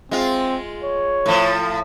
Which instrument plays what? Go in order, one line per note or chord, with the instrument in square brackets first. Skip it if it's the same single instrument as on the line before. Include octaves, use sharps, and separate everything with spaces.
[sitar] G#3 F4 [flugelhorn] C4
[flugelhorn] C#5
[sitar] A2 F3